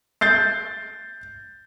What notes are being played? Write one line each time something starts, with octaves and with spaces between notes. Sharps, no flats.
G6 A6 C7